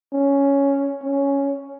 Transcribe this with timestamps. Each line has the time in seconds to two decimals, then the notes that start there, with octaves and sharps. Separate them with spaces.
0.13 C#4
1.03 C#4